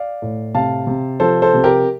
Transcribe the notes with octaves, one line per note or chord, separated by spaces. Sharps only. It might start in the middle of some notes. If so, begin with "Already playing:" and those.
Already playing: D5 F5
A2
C3 F5 A5
C3
F3 A4 C5
A4 C5
C3
G4 A#4